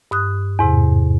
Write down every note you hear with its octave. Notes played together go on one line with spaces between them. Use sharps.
G2 D#6 F#6
E2 G#2 C3